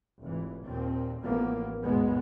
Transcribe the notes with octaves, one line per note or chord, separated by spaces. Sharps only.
F1 G#2 E3
D#2 A#2 C4
A1 A2 F3 A#3 B3
G#1 D#2 B2 G#3 B3